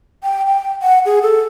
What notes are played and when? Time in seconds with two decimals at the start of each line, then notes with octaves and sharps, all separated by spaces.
0.23 G5
0.46 G5
0.82 F#5
1.05 G#4
1.22 A4